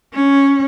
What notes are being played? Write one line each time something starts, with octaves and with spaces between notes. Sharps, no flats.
C#4